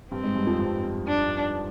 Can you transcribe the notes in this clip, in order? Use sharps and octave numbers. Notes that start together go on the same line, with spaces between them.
G2 G3 C4
G#2 G#3
G2 G3
F2 F3
G2 G3
D4